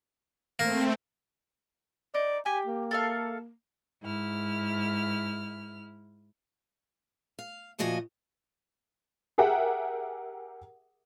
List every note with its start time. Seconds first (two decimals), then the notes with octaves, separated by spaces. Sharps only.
0.59 A3 A#3 C4
2.14 D#4 D5
2.46 G4 G#5
2.66 A#3
2.91 A4 E5 F5
4.03 G#2 E4 F6
7.39 F5
7.78 D2 A#2 F3 F#4 D#5 G#5
9.38 G4 G#4 A#4 E5 F#5 G5